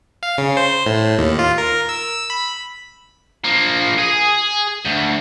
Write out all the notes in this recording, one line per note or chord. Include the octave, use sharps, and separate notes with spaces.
F5
C#3
C5
A2
D#2
F4
A#4
E6
B5
F3 A#3
G#4
D2